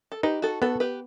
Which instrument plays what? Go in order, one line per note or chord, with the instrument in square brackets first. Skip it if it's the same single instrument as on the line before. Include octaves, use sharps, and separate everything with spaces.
[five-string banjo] A4
[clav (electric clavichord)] D#4 [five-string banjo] G4 B4
[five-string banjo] F#4 A4
[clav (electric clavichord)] B3 [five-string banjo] F#4 A4
[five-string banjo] G4 B4